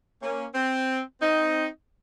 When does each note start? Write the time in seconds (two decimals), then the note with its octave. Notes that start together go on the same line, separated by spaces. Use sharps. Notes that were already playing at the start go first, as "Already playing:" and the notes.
0.22 A#3 C#4
0.54 C4
1.20 C4 D#4